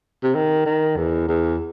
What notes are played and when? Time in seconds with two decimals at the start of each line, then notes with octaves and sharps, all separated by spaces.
0.23 C3
0.35 D#3
0.66 D#3
0.97 E2
1.28 E2